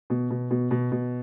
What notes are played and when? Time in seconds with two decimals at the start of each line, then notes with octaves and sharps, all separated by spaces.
0.10 B2
0.30 B2
0.51 B2
0.71 B2
0.92 B2